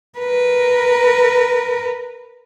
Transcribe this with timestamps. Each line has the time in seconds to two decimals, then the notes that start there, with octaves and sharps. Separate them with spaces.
0.19 A#4 B4